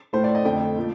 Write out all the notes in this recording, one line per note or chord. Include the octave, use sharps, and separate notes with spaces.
A2 A3 C5
D5
D#5
F2 D3 A3 G5
A#2 F3 A3